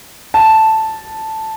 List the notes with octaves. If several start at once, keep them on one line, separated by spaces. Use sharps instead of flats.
A5